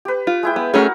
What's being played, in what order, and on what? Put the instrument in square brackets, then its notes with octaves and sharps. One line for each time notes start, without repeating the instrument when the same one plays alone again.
[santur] G4 B4
[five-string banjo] F4
[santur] G#3 E4 G5
[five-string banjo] B3
[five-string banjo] A3 C#4 G#4 [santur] F#4 A#4 F#5